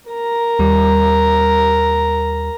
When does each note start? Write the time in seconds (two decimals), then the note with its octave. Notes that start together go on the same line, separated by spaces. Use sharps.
0.10 A#4 A#5
0.59 D#2 G3